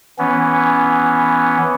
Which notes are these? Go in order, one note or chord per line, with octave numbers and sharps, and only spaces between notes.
E3 B3 C#4